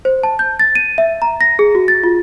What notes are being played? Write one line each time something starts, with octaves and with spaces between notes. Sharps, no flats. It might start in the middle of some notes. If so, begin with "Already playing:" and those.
C5
A5
G6
A6
D#7
E5
A#5
A#6
G#4
F#4
A6
F4